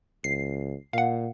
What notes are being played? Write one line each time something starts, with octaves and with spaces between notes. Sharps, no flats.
C#2 C7
A#2 F5 F#5